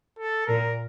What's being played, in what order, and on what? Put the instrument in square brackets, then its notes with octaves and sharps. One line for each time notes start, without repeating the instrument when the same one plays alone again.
[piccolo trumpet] A4
[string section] A#2 [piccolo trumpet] A#4